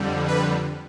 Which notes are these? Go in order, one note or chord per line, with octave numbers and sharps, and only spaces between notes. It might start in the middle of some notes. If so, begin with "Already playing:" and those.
Already playing: F2 D3 G3
B4